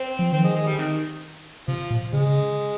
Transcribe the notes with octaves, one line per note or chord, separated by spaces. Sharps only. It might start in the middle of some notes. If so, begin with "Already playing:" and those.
Already playing: C4
F3
D#3 C4
G#3
G#3
G3
C3 D#3
C3 F3
A#2
C#3 G#3